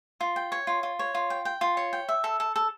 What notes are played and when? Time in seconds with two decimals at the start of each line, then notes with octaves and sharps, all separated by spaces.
0.21 F4
0.36 G5
0.52 C#5
0.67 F4
0.83 F4
0.99 C#5
1.15 F4
1.30 G5
1.45 G5
1.61 F4
1.77 C#5
1.93 G5
2.09 E5
2.24 A4
2.40 A4
2.56 A4